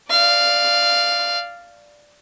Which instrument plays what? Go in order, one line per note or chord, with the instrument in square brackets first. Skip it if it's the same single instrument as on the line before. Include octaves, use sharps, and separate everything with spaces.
[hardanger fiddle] D5 F5